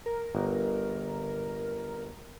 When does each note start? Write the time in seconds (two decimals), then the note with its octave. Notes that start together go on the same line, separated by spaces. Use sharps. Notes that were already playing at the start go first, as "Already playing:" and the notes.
0.06 A#4
0.35 G1